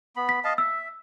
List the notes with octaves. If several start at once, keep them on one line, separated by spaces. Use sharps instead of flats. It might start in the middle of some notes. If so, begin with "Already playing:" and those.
B3 B5
B6
D#5 F5 A5
E5 E6